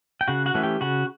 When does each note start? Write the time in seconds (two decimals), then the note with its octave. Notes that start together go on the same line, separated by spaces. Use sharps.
0.21 G5
0.28 C#3 F#4 F#5
0.46 F#4 F#5
0.54 E3 A3 C#4
0.63 G4 G5
0.81 C#3 F#4 F#5